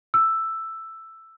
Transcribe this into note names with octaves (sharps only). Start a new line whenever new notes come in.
E6